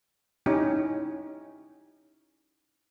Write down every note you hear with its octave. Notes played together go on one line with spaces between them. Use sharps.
C#4 D#4 E4 G4